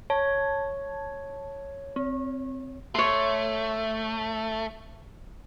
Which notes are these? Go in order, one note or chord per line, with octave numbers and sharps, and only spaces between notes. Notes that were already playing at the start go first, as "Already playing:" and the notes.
C#5 A5
C4
A3 C#5 C6